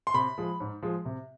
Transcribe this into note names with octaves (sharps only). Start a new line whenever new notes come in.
C6
C3 B5
F3 G#3
G#2
F3 G#3
C3